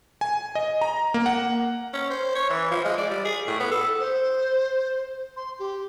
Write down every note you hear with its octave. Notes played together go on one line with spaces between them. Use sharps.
G#5
D#5
A#5
A#3
F#5
C#4
C5
C#5
E3
F3
G#3
D5
G3
G#4
A2
B3
A4
C5
C6
G4